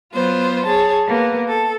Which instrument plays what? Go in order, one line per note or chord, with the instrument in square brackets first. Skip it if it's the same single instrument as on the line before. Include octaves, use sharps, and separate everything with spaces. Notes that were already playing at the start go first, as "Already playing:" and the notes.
[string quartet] F#3 B3 F4 C5
G#4 C#5 A5
A#3 B3
A4